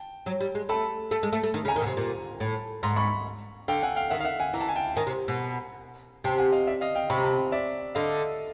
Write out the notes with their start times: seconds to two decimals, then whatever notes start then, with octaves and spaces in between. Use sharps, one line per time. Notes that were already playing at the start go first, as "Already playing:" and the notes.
Already playing: G5 A5
0.26 F#3
0.41 G3
0.55 G#3
0.69 A3 A5 B5
1.11 A3
1.23 G#3
1.33 A3
1.43 A3
1.54 D#3
1.65 C#3
1.68 G#5 A#5
1.76 D#3
1.82 B2
1.86 C3
1.97 A#2
2.40 A2
2.83 G#2 A#5 C6
2.96 B5 C#6
3.68 D3 F5 G5
3.83 F#5 G#5
3.96 F5 G5
4.10 D#3 E5 F#5
4.20 F5
4.25 E5 F#5
4.40 F#5 G#5
4.54 E3 A#5
4.61 A5
4.69 G#5
4.76 G5 A5
4.96 D#3 G#5 A#5
5.07 C3
5.28 B2
6.24 C3 G5 A5
6.38 F#5 G#5
6.52 D#5 F5
6.67 D5 E5
6.81 D#5 F5
6.95 F5 G5
7.10 C3 B5 C#6
7.18 A#5
7.23 A5 B5
7.52 D5 E5
7.95 D3 D#5 F5